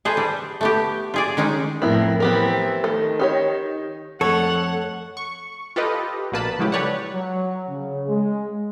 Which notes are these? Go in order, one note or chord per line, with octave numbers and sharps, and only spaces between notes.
G#4 A4 B4 C5
G3
A3 B3 G4
F4 G#4 D5
D#3 G#3 C#4 D#4
F2 A2 B3 C4 E4 A#4
E3 B3 C4 E4 G4 A#4
D#3 A3
D#4 G4 C#5
F2 A3 A4 C#5 F#5
C#6
F4 G4 A4 B4 D#5
A#1 B2 A#3 B4 A5 B5
C#3 F3 F#3 G#3 E4 G4
G4 A4 B4 C#5 D5 F#5
F#3
C#3
G#3